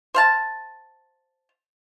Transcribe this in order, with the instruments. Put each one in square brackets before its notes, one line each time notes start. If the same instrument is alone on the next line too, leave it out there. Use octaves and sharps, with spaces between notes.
[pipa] C5 F5 A5